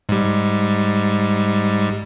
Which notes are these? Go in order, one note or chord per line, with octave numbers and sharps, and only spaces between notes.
G#2 G3